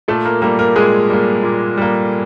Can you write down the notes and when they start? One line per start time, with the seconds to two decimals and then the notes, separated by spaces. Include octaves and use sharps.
0.08 A#2 A3 A4
0.25 A#3 A#4
0.42 G3 A#3 A#4
0.59 A#3 A#4
0.76 A#2 G#3 G#4
1.10 G3 A#3
1.43 A#2
1.77 G3 A#3